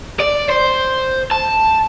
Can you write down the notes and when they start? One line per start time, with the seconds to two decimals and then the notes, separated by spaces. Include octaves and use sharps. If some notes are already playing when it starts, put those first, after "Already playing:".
0.20 D5
0.49 C5
1.31 A5